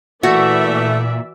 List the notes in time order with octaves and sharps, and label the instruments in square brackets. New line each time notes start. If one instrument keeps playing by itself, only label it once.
[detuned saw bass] A#2 [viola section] E3 D5 E5 [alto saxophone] A3 [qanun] F#4